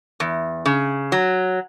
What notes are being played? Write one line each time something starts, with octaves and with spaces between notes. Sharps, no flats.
E2
C#3
F#3